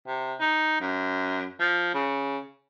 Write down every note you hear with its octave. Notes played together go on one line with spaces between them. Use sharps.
C3
D#4
F#2
F3
C#3